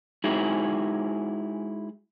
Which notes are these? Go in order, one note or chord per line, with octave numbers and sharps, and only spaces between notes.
G#3 D#4 E4 F#4 G#4